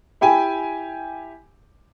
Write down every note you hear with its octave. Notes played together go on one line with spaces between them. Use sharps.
E4 G4 G5 G#5